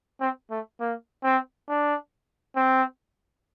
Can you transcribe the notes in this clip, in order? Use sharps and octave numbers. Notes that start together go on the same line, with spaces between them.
C4
A3
A#3
C4
D4
C4